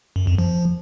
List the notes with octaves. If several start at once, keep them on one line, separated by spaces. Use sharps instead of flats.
F#2
F2
F3